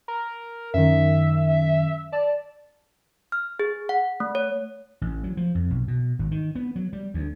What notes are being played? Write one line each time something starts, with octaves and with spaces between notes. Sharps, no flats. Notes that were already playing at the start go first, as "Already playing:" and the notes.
A#4
F#2 D#3 E5
D5 A5
F6
G#4
F#5
A3
C#5
A1
F#3
F3
F2
B1
B2
G#1
D#3
B3
F#3
G3
D2